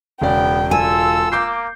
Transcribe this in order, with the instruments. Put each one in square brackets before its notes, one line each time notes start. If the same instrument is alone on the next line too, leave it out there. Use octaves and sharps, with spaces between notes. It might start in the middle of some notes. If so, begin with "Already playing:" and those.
[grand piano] E1 C#3 D5 [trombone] B3 [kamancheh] G5
[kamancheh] F4 E6 [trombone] A4 [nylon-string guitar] G#5
[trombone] A#3 [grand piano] D6 G6 C7